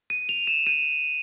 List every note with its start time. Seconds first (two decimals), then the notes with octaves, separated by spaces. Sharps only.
0.10 D#7
0.29 F7
0.47 E7
0.67 D#7